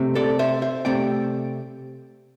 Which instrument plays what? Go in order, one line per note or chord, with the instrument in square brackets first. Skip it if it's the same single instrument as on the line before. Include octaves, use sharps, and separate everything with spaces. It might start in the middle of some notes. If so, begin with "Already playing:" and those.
Already playing: [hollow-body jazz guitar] C3 A3 C4
A4 D5
C5 E5
C5 E5
C3 A3 C4 D5 G5